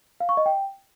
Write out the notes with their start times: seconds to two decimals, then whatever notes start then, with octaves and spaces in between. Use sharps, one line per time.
0.20 F5
0.29 C#6
0.37 D#5
0.46 G5